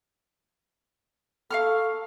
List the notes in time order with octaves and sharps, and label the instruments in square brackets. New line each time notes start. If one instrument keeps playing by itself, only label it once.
[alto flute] A4 [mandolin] F5 C#6 F6